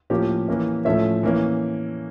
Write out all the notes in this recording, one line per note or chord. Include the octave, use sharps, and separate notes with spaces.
A2 F3 A#3 C#4 G4
E3 A#3 C#4
A2 F3 A3 C#4 E5
E3 A#3 C#4